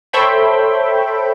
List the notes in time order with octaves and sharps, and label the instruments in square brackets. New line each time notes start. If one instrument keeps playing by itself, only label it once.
[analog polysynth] A4 C5 C#5 E5 G5 B5